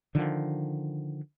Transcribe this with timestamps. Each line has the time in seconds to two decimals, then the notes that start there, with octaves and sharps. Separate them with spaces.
0.15 D3 D#3 F3